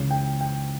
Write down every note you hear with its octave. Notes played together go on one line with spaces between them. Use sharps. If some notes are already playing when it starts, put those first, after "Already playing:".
Already playing: C#2 C#3 E3
G5
G5